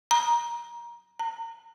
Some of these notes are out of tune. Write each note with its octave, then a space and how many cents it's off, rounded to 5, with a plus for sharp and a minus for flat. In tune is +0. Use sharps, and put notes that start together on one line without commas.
A#5 +20
A#5 -35